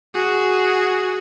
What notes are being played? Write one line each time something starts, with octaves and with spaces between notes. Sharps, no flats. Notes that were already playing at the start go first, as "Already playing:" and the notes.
F#4 G#4